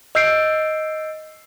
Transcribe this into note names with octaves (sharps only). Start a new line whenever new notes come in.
D#5 E6 G6 C7 D7